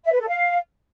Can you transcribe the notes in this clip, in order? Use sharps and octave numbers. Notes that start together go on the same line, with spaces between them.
E5
B4
A4
F5